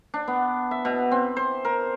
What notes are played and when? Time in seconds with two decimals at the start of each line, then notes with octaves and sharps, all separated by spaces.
0.14 D4
0.28 B3
0.71 E5
0.85 B2
1.12 C4
1.37 C5
1.65 A#4